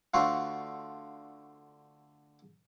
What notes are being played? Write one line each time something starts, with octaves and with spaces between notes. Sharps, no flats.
D3 A3 F4 F#4 C5